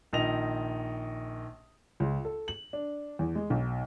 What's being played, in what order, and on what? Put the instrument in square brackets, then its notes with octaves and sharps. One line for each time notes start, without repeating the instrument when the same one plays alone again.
[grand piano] A#1 D#3 D#5 A#6 F7
[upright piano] C#2
A4
F#7
D4
E2
G#3
B1